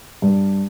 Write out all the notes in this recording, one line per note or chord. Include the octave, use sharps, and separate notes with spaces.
G2